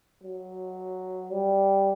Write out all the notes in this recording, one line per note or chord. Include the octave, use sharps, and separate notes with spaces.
F#3
G3